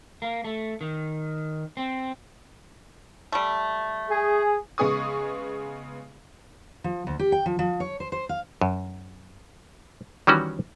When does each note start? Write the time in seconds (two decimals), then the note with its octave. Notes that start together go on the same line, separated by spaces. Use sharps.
0.22 A#3
0.44 A3
0.81 D#3
1.77 C4
3.32 G3 A3
4.10 G#4
4.78 C#3 G#3 B3 G#4 C#6 D#6
6.84 F3
7.07 D2
7.19 G4
7.32 G5
7.46 F3
7.59 F3
7.80 C#5
8.00 C5
8.12 C5
8.29 F5
8.61 F#2
10.27 D#3 E3 G3 C#4 F#4